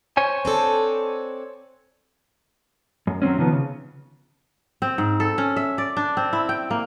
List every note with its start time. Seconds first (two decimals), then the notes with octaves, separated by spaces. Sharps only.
0.17 C5 C#5 G#5
0.45 C4 D4 A4
3.07 F#2
3.22 F#3 G3 C4 C#4
3.37 C3 D#3 F3 B3
3.52 C#3
4.82 C4
4.98 G#2
5.20 A4
5.38 C#4
5.56 E5
5.78 D5
5.97 D4
6.17 C4
6.33 E4
6.49 G5
6.71 A#3